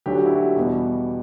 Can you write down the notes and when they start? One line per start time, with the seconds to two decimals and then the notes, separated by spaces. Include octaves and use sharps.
0.06 D2 D3 F#3 G4
0.15 F#4
0.26 E4
0.35 F#4
0.56 E2 B2 G3